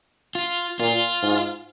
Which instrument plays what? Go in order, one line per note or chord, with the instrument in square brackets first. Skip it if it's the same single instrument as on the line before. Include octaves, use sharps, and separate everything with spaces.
[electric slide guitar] F4
[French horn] A#2 [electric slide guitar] F4
[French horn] G#2